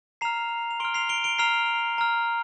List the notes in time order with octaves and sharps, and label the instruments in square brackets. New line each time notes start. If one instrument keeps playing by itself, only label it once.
[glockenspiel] A#5 F6 C7 F7
F7
C6 F6 D7 G7
C7 F7
D7 G7
D7 G7
A#5 F6 C7 F7
A#5 F6